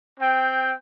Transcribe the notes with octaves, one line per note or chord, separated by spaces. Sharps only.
C4 G5